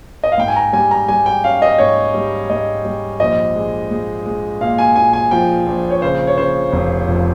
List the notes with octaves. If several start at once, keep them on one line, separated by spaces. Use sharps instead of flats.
D#5
F5
G#2 G5
G#5
A#5
G3 G#5
A#5
G3 G#5
G5
C#4 F5
D#5
G#2 C#5
G3
G#2 D#5
G3
A#1 D#5
G#3
G#3
G#3
A#2 F5
G#5
A#2 G#5
G#5
F3 G5
A#1
C#5
C#3 C5
C#5
C#3 C5
F1
F2